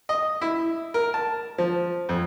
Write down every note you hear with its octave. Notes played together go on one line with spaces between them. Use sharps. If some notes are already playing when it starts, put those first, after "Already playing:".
D#5
E4
A#4
A5
F3
F2